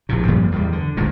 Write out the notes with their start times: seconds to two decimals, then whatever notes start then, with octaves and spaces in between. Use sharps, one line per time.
0.09 A#1 A2 C3
0.28 G2 A#2 F3 G3
0.52 E2 D#3 G3
0.72 D3
0.97 G#1 D2 G2 A#2